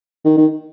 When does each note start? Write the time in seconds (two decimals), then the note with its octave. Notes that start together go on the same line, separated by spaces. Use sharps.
0.25 D#3
0.37 D#3